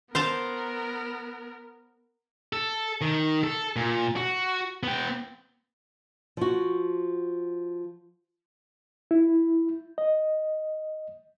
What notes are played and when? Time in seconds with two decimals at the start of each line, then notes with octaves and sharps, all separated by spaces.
0.15 B3 A#4 C5 F5 A5
2.53 A4
3.01 D#3
3.43 A4
3.76 A#2
4.16 F#4
4.83 B3 G5
6.37 F3 F#4
9.11 E4
9.98 D#5